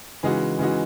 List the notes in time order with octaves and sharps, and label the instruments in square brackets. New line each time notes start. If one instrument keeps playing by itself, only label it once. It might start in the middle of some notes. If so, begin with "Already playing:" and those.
[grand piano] C#3 G#3 D#4 F#4 [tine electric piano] E3
[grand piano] C#3 G#3 D#4 F#4 [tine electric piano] E3